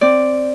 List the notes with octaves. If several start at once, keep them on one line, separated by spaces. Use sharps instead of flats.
C4 D5